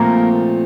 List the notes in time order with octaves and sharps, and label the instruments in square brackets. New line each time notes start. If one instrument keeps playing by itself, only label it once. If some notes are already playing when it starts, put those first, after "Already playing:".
Already playing: [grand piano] A#2 F3 A3 C4 [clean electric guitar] A#3 A#4